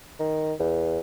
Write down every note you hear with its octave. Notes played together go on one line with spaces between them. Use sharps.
D#3
E2